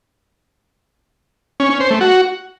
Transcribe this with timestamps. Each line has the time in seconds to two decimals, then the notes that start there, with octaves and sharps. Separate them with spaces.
1.60 C#4
1.70 C#4
1.80 C5
1.90 A3
2.01 F#4